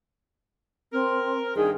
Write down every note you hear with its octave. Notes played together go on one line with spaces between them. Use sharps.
C4 A#4
G2 D#3 G#4